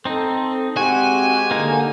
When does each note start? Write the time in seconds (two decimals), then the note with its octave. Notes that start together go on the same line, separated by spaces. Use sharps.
0.05 C4 D#4 A4
0.77 G#3 C4 F#4 G4 G#5
1.51 D3 A#3 D#4